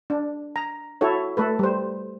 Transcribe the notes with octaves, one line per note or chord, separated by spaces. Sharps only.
D4
A#5
E4 F#4 A4 C#5
A3 A4 B4
G3 C5